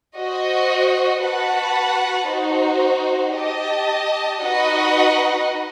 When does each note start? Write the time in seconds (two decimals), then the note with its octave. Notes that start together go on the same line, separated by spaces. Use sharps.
0.17 F#4 C5 D#5
1.23 F#4 B4 F#5 A5
2.29 D#4 F#4 C5
3.36 G4 D#5 A5
4.42 D#4 F#4 B4 D#5 F#5